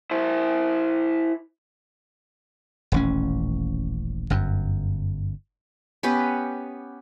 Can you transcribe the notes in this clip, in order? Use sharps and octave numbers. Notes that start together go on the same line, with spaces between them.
E4 C5
D#1 A1 C#4
G1 F#2
B3 C#4 G4 B4